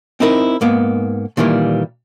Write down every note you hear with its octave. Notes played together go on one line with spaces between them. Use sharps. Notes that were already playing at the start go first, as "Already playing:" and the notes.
C4 D#4 E4 A#4
G#2 A#3 B3
A#2 D#3 E3 G3 A#3